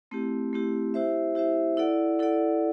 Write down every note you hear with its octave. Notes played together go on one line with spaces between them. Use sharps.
A3 C4 E4 G4
A3 C4 E4 G4
E4 G4 C5 E5
E4 G4 C5 E5
E4 A4 D5 F#5
E4 A4 D5 F#5